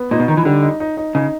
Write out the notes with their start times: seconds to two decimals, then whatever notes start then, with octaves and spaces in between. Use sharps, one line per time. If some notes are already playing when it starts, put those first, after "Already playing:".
Already playing: B3
0.11 A#2 D#4
0.20 B2
0.28 D#3 D#4
0.37 E3
0.45 D3 G3
0.63 D#4
0.80 D#4
0.97 D#4
1.15 C#3 D#4